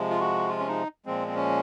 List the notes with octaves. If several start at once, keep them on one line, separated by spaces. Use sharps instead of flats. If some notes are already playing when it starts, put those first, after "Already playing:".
Already playing: C3 F3 G#3
F4
F#4
F4
C#4
D#4
A#2 F3 G#3 C4
C4
C#4